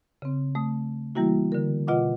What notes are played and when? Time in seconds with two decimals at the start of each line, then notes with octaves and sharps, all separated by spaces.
0.22 C#3 C4
0.55 A3 D#6
1.15 E3 G3 A#3 E4 F#4
1.52 D3 A#4
1.87 B2 F4 D#5 F#5 D6